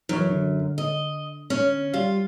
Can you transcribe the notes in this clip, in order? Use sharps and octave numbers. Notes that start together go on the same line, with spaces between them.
F#2 E3 C#5
D3
D#5
C#4
G3 F4 F5